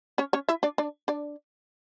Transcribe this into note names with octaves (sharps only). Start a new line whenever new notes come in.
C#4 C#5
C#4 C#5
E4 E5
D4 D5
D4 D5
D4 D5